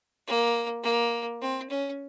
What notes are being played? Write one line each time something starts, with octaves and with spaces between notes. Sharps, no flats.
A#3
A#3
C4
C#4